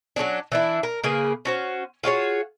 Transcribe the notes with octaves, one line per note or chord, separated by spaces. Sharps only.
F#3 G#3 C#4 D4
E3 D4 E4
A#4
C#3 A#3 G#4 B4
C#4 F#4 C5
F4 F#4 G#4 C#5